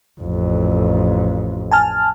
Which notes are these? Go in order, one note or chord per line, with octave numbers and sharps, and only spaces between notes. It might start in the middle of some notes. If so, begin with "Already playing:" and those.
A1 F2
G#5 A5 F6